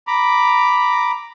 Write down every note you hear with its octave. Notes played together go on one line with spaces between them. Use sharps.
A#5 B5 D6